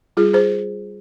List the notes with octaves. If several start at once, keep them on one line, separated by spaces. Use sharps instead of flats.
G3 F4 G#4
G#4 C5